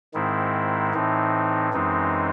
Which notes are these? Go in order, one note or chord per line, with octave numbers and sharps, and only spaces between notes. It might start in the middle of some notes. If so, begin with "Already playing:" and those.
G#2 D#3 G#3 C4 E4
A2 E3 C4 D#4
F#2 E3 G#3 C4 D#4